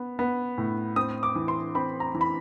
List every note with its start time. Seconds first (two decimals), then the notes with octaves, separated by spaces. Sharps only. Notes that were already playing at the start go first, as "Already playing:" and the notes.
Already playing: B3
0.19 B3
0.58 A2
0.96 C4 D#6
1.23 D6
1.35 E3
1.48 C6
1.75 C4 B5
2.00 A#5
2.14 E3
2.21 B5